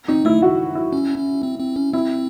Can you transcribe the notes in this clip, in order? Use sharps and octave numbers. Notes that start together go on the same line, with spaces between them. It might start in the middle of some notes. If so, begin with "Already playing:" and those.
C4 D#4
A3 E4
F#4
E4
C#4
C#4
C4
C4
C#4
C4 E4